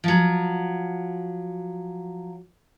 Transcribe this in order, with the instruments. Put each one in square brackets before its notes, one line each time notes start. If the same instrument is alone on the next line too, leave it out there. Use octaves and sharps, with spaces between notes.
[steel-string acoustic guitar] F3 F#3